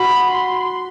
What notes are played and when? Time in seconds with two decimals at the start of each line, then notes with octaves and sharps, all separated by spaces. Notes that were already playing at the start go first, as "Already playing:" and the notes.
Already playing: F#4 B5
0.31 C6